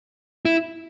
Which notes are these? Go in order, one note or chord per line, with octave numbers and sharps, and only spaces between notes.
E4